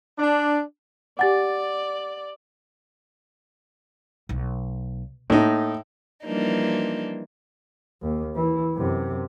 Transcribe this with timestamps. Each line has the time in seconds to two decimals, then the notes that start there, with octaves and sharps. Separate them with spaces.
0.19 D4
1.19 G4 D5 F#5 G#5 D6 A6
4.29 B1
5.30 A2 A#3 D#4
6.25 E3 F3 G3 A#3 D4 D#4
8.02 D#2
8.35 E3 E4
8.75 F#2 C3